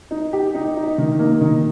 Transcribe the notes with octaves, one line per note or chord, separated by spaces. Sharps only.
D#4
G4
D#4
D#4
D#3
A#3
D#3